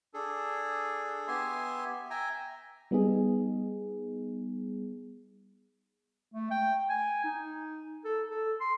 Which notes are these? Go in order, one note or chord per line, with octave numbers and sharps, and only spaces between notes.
D4 G#4 A4
B3 G4 E5 G#5 C6
E5 G5 G#5 A#5
G3 B3 D#4 G#4
A3
G5
G#5
D#4
A4
A4
C6